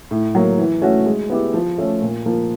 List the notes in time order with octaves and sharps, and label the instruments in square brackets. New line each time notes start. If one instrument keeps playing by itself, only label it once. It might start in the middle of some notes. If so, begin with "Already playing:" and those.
[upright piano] A2
F#3 A#3
E3
A3 C#4 F#4
G#3
B3 E4 G4
F3
A3 C#4
A#2
F3 A#3